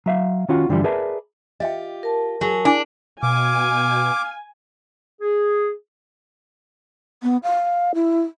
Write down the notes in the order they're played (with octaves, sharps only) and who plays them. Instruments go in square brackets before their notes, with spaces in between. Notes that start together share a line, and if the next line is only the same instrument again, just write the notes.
[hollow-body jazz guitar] F#3 E5 F5
D#3 C#4 F4 F#4 F#5
G2 D3 E3 F3 G3
G#4 A#4 B4 D5 E5 A5
[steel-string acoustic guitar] F4 G4 [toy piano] D#5 E5 G5
[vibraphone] A#4 A5
[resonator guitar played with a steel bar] F#3 [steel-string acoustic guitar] G#4
[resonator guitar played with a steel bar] D4 [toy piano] E4 G#5 D6
[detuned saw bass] B2 [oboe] F5 [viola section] G#5 [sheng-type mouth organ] D6
[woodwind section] G#4
[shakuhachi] B3
F5
E4